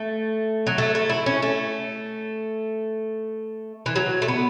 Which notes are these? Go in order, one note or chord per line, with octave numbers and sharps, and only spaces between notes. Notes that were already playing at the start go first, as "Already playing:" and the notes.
Already playing: A3
F#3
A3
A3
E4
C#4
A3
E3
F#3
A3
B3